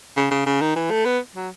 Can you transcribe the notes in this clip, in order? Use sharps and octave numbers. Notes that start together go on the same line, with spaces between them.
C#3
C#3
C#3
D#3
E3
A3
B3
F#3